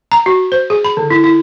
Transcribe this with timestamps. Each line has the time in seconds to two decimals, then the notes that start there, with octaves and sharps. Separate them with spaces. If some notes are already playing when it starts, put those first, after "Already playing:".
0.12 A#5
0.26 F#4
0.52 C5
0.70 G#4
0.84 B5
0.97 D3
1.10 E4
1.24 E4